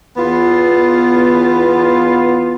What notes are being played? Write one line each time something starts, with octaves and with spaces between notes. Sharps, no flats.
E2 B3 F4